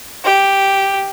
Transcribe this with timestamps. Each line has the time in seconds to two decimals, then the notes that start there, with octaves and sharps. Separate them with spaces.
0.24 G4